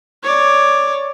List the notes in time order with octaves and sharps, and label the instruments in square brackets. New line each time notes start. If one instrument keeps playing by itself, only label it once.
[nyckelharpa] C#5 D5